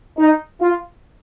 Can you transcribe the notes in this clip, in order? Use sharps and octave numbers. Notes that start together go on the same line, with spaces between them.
D#4
F4